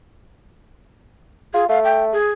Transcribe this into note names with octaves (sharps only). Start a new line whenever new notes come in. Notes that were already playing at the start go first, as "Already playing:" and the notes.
F4 G#4
A3 F5
G5
G#4